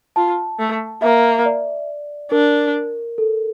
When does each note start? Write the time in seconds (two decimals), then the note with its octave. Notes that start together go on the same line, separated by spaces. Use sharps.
0.16 F4 A5
0.59 A3
1.02 A#3 E5
1.46 D5
2.32 D4 A#4
3.18 A4